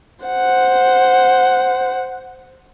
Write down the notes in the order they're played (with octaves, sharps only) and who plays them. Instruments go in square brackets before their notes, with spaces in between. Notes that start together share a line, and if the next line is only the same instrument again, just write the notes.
[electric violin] C5 F#5